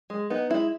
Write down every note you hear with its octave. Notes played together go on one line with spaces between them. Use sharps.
G#3
B3 D#4
G#3 E4